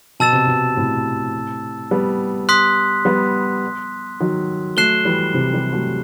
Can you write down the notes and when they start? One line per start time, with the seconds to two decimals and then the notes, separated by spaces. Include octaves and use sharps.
0.20 B2 A5 E6 A6 E7
0.33 C3
0.47 B2
0.77 A2 C3
1.91 G3 B3
2.49 C6 D#6 F#6 B6
3.05 G3 B3
4.20 D#3 F#3
4.77 F#3 A3 F#6 C7 E7 G7
5.05 E3 G3
5.34 C3 E3
5.53 E3 G3
5.73 F#3 A3